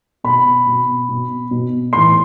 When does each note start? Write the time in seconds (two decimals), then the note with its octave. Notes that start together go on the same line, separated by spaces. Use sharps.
0.24 B2 B5
0.67 B2
1.09 B2
1.51 B2
1.93 A2 E3 C6